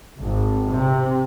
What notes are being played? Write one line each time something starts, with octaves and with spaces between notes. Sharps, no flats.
G#1
C3